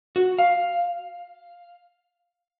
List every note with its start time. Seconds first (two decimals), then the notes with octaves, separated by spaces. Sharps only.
0.16 F#4
0.39 F5